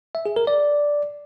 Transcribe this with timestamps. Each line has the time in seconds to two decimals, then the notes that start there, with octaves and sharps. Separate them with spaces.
0.15 E5
0.26 G#4
0.36 A#4
0.47 D5